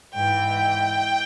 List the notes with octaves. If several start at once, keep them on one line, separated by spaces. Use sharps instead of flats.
G#2 E3 G5